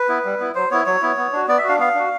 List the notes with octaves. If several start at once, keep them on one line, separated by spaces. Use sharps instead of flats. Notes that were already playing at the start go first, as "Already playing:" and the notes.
Already playing: B4
B3 E4
G3
B3 E4
F#3 C5
B3 E4 C#5
F#3 C#5
B3 E4
B3
D4 F#4
B3 D5
E5
D4 F#4 F5
B3 F5
D4 F#4